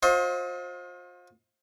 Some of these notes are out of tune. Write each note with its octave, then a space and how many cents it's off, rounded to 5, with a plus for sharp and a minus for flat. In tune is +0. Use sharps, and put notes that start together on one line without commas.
F4 +40 C5 +25 D#5 +40